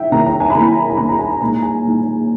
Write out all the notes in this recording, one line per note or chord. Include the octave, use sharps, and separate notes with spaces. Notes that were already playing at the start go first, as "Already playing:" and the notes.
Already playing: D#3 E4 E5 G5
D#3 A#3 E4 A#5
A#5
G#5
B5
D#3 A#3 E4 A#5
A#5
D#3 A#3 E4 B5
A#5
G#5
A#5
A#2 G#3 D#4 A#5
G#5
A#2 G#3 D#4